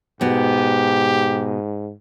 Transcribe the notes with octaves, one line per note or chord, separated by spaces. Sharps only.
G#2 B2 B3 G4